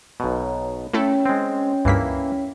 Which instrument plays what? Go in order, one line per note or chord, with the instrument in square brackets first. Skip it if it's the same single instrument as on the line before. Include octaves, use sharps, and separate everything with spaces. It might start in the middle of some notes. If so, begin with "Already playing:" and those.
[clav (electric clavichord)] B1 B2 [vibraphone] C#5 A#5
[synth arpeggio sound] A3 E4 A4 [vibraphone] C#4 C#5 G5
[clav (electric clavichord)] G#3 C4
[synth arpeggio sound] C#2 G2 B6 [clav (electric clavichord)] E3 A#3 E4